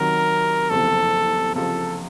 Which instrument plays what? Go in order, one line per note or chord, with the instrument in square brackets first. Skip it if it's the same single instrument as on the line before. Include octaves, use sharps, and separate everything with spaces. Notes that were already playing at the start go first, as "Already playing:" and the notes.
Already playing: [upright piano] C3 D#3 F#3 [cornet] A#4
[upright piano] F#1 E2 C3 F3 [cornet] A4
[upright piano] C#2 C3 F3 [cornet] A4